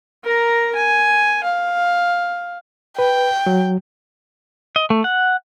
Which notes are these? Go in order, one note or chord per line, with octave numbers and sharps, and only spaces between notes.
A#4 A#5
G#5
F5
B4 G5
F#3
D#5
A3
F#5